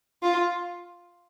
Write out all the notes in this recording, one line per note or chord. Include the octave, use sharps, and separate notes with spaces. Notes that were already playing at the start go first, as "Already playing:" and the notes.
F4